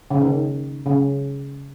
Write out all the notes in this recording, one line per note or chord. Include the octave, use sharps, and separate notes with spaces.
C#3
D#3
C#3